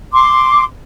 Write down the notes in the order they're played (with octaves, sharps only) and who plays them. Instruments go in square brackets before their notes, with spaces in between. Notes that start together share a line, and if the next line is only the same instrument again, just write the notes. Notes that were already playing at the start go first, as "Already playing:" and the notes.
[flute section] C6 D6